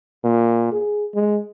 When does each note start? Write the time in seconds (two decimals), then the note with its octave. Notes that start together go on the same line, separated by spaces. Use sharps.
0.24 A#2
0.72 G#4
1.15 G#3